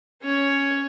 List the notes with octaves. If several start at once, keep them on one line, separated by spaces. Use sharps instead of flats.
C#4 C#5